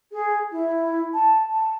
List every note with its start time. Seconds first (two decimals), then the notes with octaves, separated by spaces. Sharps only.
0.12 G#4
0.51 E4
1.14 A5
1.49 A5